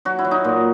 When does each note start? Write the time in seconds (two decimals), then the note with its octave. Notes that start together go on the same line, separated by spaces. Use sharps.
0.05 F#3 F#4
0.19 E4
0.25 F#3
0.31 D#4
0.45 A#2